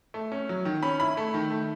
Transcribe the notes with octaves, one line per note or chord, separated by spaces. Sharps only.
A3
C#4
F#3
D#3
C#4 B5
E4 B5
A3
D#3
A3